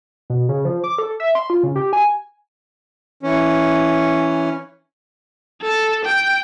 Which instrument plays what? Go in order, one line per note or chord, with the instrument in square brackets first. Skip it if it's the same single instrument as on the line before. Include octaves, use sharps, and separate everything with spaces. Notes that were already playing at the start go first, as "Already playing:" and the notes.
[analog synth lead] B2
C#3
F3
D6
A4
E5
C6
F4
C#3
G4
G#5
[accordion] E3 C#4
[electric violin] A4
G5